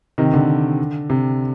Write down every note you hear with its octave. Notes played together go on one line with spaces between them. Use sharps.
C3 D#3
D3
C3